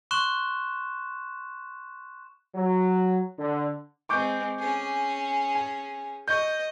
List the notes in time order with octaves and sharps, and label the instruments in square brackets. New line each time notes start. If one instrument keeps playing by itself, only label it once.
[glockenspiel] C6 C#6 F#6 E7
[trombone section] F#3
D3
[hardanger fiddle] G#3 C4 [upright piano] C#6 D6 G6
[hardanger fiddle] C#4 G#4
[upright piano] G#5
[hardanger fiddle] D#5 [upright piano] C#6 G6